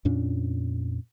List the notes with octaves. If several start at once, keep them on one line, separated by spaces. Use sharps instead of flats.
F2 A#2 C#4 D4